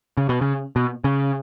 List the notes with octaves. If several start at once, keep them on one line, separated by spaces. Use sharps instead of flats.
C#3
B2
C#3
B2
C#3